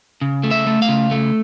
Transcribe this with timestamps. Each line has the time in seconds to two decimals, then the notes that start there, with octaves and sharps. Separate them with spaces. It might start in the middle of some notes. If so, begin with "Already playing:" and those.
0.22 C#3
0.43 A3
0.51 E5
0.66 A3
0.82 F5
0.89 C#3
1.11 A3